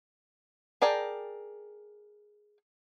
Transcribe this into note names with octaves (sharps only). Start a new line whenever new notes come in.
G#4 A#4 D5 G5 A5